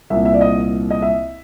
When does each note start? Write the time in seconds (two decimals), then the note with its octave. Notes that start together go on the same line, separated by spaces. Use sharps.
0.10 C2 A#2 E5
0.25 E5
0.34 D5
0.41 D#5
0.91 D#5
1.02 E5